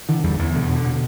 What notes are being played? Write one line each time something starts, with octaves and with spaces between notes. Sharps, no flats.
D3 E3
E2 D3 G3
E2 E3
B2 D3
B2
D3
B2